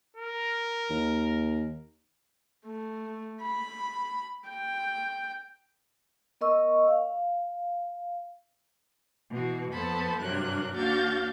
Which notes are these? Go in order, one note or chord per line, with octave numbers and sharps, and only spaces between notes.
A#4
D#2
A3
B5
G5
B3 A#4 D#5 C#6 E6
F5
B2 E3 F#4
F2 B3 A4 C5 A5 B5
G2 C3 F#3 D4 A#4 F#6
D#2 D4 F#4 F5 G6 A6